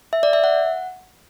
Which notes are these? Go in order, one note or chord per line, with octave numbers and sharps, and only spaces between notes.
E5
D5
E5
F#5